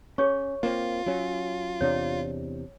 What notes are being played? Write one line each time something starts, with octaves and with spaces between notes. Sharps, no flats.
C#4 G#4 C#5 C#6
A#3 C4 F4
F#3 C#4
E2 C3 D4 C#5